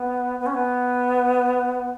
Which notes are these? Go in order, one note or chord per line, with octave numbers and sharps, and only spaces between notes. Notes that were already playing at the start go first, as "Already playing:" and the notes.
Already playing: B3
B3
C#4
B3